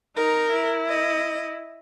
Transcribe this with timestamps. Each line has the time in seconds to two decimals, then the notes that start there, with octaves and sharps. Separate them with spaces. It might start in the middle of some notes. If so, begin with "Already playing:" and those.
0.16 D#4 A#4
0.52 E4
0.88 D#5